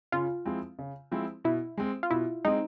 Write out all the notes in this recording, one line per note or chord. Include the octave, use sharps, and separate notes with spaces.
C#3 F4
F3 G#3 C4 E4
C#3
F3 G#3 C4 E4
B2 E4
G#3 C4
F4
B2 E4
G#3 C4 D#4